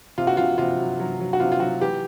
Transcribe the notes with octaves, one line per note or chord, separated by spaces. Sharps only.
C3 F4
F#4
C3 F4
C3 F4
F#3
F#3
F#3
F#4
C3 F4
F4
F#3 F#4
E3 G4